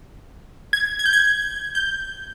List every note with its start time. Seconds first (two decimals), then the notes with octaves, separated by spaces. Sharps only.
0.73 G#6
0.99 G#6
1.05 G6
1.13 G#6
1.75 G6